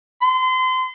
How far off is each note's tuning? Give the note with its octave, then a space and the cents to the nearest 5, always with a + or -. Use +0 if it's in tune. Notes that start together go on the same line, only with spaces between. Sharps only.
C6 -30